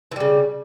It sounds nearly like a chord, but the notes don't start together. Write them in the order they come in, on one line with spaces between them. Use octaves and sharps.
E3 G3 C#3